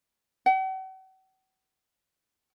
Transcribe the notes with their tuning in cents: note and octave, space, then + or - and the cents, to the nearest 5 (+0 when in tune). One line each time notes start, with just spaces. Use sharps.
F#5 +45